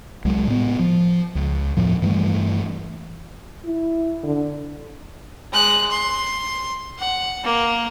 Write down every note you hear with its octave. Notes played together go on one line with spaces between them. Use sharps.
C2 F#3 G#3
A2 B3
F3
C#2
E2 A2 F3
G2 E3 G3 A3
E4
D3
G#3 F#6
C6
F#5
A#3